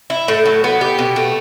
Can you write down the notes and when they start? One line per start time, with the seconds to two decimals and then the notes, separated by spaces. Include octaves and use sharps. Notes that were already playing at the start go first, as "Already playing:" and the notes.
0.10 E4
0.28 A2
0.46 F#3
0.64 B3
0.81 G4
0.99 B2
1.16 A3